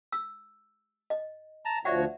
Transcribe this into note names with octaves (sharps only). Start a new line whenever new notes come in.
E6
D#5
A5 A#5
D2 F3 F#4 C#5 D5 E5 F#5